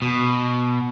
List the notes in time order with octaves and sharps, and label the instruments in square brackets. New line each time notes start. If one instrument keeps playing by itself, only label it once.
[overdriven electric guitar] B2